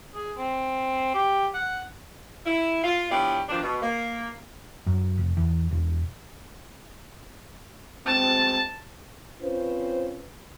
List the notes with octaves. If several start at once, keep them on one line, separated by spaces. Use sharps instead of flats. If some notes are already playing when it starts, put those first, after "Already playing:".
G#4
C4
G4
F#5
E4
F4
F3 B3 C#4 D4 E4 G4
B2 D#3 F3 D4
B2
A#3
F#2
F1
E2
E1
B2 G#3 C4 A5
C4 C#4 F4 B4 C5